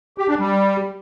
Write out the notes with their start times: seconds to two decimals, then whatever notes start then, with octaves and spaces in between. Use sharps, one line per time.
0.18 G4
0.28 D4
0.39 G3